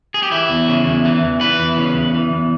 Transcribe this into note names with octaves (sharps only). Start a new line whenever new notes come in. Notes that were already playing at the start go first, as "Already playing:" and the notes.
G#4
G4
E3 E4
E2
C#3
E2
E3
E2
E3 B4
E2
C#3
E2
E3
E2